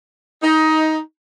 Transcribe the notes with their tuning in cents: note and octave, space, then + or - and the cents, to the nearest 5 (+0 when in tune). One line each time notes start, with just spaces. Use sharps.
D#4 +15